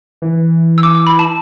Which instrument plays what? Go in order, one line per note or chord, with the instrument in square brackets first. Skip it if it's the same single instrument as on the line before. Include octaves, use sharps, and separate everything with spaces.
[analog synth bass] E3
[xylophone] E6
D6
D6
B5
A5